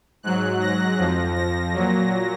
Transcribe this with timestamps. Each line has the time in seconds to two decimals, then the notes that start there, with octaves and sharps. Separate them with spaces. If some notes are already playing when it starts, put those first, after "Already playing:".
0.23 G#2 F#3 F#6
0.60 A#6
0.98 F2 F3
1.35 A#6
1.74 A#2 F#3